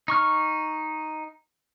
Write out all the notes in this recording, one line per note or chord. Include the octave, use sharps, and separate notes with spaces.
D#4 C#6 F6